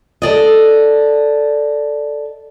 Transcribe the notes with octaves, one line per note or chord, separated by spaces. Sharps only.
A4 D5 D#5